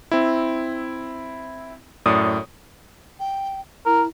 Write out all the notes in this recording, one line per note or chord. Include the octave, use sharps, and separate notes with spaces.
C4 E4
F#2 A2 D5 D#6
G5
E4 A#4